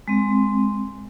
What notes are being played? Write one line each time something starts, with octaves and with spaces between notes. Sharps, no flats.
G#3 C4